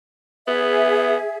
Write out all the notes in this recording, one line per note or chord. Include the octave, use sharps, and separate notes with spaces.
B3 G#4 E5